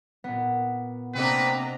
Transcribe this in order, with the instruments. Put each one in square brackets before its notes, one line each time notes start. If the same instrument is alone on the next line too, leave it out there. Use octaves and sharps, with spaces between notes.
[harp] A#2 B3
[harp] C3 D#5 [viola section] A#3 D4 A#5 [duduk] C4 [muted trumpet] B4